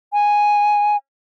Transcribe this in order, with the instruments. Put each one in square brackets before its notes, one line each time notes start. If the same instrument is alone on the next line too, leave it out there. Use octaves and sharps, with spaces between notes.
[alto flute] G#5